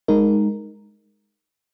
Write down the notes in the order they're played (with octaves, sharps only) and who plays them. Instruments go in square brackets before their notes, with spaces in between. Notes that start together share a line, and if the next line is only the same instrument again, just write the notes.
[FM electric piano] G#3 D#4 A#4